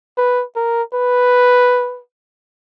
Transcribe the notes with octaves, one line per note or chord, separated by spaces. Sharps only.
B4
A#4
B4